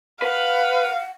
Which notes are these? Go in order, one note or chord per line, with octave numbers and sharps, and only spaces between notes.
B4 F5 F#5